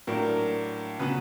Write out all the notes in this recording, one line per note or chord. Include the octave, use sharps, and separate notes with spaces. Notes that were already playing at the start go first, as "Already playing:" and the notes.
A2 F#3 A#3 D4 A#4
C#3 F#3 B3 B4